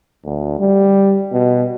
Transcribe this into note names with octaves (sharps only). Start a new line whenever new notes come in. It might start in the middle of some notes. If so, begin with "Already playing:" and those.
D2
G3
B2